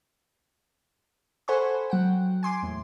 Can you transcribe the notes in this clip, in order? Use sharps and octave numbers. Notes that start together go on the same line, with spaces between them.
A4 C5 F#5 G#5 B5 C#6
F#3 F#5 G5
G#5 C6 D6
E2 A2